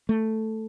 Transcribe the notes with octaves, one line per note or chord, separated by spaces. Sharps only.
A3